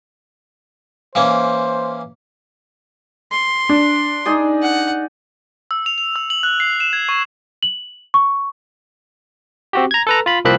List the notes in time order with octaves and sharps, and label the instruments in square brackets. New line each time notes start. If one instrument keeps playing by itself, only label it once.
[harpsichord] E3 A#3 C#4 [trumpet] C5
[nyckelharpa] C6
[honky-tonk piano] D4
[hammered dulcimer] D#4 G#4 D5
[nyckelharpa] F#5
[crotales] E6
F7
F7
E6
F#7
F#6
C7
E7
G#6
C#6
[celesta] F#7
C#6
[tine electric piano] C4 F#4 G4
A#5 G#6
A4 B4 A#5
F4 B5
C2 F3 A#3 C4 B5 F#6